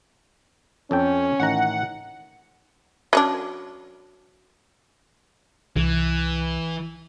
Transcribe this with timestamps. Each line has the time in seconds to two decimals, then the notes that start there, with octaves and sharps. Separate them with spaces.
0.91 F2 C#4 A4 G5
1.40 A1 D#3 F#5 A#5
3.13 F#3 C#4 D4
5.76 C2 E3